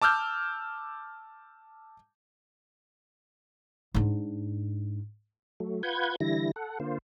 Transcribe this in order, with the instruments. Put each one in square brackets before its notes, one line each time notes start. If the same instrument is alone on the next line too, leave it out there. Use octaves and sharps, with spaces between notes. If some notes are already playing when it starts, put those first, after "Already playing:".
[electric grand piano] A5 D6 E6 F6 G6
[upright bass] G#2 D4
[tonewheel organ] F#3 A3
F4 B4 F#5 G6 G#6
D3 E3 G3 E4 A#6
A4 F#5
D3 A#3 F4 C5